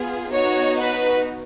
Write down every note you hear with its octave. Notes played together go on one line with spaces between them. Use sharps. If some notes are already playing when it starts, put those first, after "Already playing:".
Already playing: B3 F4 G#4
B3 D#4 F#4 C#5
B4